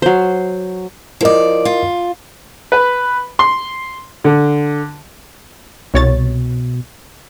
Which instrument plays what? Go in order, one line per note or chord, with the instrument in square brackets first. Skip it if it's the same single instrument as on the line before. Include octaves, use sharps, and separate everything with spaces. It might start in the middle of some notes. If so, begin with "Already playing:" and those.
[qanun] F#3 C5
[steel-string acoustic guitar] F3 D5 [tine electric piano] E4 A#4 D#5
[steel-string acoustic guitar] F4
[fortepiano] B4
C6
D3
[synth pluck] C2 C#5 A6 [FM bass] B2